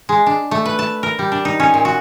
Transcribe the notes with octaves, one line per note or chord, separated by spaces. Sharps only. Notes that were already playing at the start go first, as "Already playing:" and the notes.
G#3
D4
A3
B4
A5
A#4
G3
D4
D#4
C#4
A#2
F#4